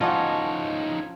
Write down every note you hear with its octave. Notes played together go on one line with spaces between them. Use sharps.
A2 F3 C#4 D#4 C#5 D#5 F#5